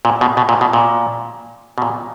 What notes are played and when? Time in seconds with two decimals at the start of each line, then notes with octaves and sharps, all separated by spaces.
0.05 A#2
0.21 B2
0.37 B2
0.49 A#2
0.61 B2
0.73 A#2
1.78 B2
1.82 A#2